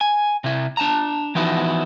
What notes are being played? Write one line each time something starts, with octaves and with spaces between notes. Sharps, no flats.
G#5
C3 E4
D4 A5 A#5
E3 F3 B3 D#4 E4 F#4